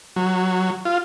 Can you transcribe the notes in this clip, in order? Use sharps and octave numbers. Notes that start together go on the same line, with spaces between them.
F#3
F4